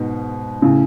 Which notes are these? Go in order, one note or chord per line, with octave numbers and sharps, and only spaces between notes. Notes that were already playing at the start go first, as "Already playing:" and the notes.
Already playing: G#2 B2
A2 C#3